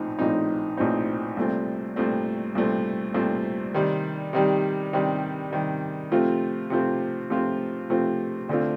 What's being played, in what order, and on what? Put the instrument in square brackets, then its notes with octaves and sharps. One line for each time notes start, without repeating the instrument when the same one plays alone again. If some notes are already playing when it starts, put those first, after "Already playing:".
Already playing: [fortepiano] A#1 A2 F3 C4 D#4
A#1 A2 F3 C4 D#4
A#1 A2 F3 C4 D#4
C2 A#2 A3 C4
C2 A#2 A3 C4
C2 A#2 A3 C4
C2 A#2 A3 C4
C3 D#3 G3
C3 D#3 G3
C3 D#3 G3
C3 D#3 G3
C3 F3 A3 C4 F4
C3 F3 A3 C4 F4
C3 F3 A3 C4 F4
C3 F3 A3 C4 F4
D2 D3 A3 C4 F4